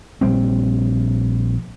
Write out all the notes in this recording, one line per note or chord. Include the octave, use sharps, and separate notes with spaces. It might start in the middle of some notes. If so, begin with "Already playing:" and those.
A#1 G3 C4